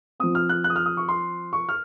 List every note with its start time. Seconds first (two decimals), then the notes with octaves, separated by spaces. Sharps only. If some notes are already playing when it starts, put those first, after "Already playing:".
0.20 F3 C4 D#6
0.35 F6
0.49 F#6
0.64 F#6
0.70 D#6
0.76 F6
0.86 D#6
0.97 C#6
1.09 C6
1.53 C#6
1.69 F6